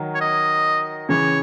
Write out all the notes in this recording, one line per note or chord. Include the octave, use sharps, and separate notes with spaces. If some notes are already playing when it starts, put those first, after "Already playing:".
Already playing: D#3 F#3
C#5
D#5
C#3 E3 C#5